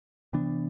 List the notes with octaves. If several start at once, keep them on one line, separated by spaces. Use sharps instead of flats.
C3 E3 B3 D4